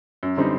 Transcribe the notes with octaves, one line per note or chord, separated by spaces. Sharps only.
F#2
D3 G3 C4 D#4